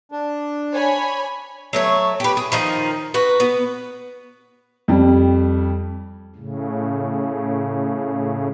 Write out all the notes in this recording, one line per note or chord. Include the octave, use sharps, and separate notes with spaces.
D4
C#5 G#5 B5
F#3 A3 C#5
G4 B4
G#4
D#3 F3 D#4
F#4 B4
B3
F2 G3
A2 C#3